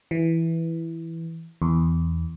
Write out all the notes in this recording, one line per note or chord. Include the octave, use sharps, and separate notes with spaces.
E3
E2